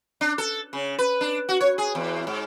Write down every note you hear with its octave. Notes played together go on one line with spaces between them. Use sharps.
D4
A4
C#3
B4
D4
F#4
C#5
G#4
E2
G#2